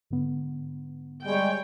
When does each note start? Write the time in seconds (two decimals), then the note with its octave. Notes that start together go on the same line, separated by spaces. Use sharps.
0.10 G#2 D3 B3
1.25 G3 G#3 C#5 G5